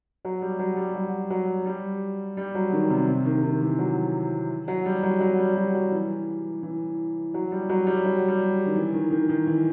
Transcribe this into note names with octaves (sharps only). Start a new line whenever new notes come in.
F#3
G3
F#3
G3
F#3
F#3
G3
G3
F#3
D#3
C3
C3
D#3
D#3
E3
F#3
F#3
G3
F#3
F#3
G3
F#3
F#3
E3
E3
F#3
G3
F#3
G3
F#3
G3
D#3
E3
D#3
D#3
D#3
E3